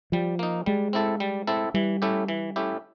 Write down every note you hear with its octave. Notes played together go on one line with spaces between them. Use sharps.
F3 G3
A#3 D#4
G3 G#3
C4 E4 A4
G3
C4 E4 A4
E3 G3
A3 C#4 E4 G4
E3
A3 C#4 E4 G4